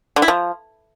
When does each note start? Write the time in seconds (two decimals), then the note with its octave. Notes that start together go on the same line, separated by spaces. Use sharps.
0.16 D3
0.22 E4
0.28 F3